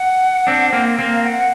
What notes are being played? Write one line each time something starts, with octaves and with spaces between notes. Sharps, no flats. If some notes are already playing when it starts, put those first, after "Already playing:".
Already playing: F#5
C4 D4
A#3 C4
A#3 C4
F5
F#5